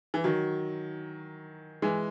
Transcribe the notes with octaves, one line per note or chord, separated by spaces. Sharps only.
E3
D#3 F#3
E3 G#3